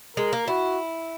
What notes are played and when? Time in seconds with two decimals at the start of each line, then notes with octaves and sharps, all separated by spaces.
0.17 G#3 A#4
0.33 A#3
0.47 E4 F#4